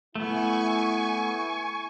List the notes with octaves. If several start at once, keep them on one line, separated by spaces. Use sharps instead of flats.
A3 B3 E4 G#5 C#6